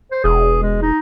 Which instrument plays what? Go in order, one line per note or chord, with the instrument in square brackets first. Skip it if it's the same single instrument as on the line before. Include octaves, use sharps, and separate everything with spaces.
[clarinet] C5
[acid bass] E1 [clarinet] G#4
[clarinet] G#3
D#4